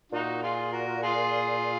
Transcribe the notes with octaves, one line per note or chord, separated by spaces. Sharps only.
A#2 D#4 F#4
F4 G#4
F#4 A#4
F4 G#4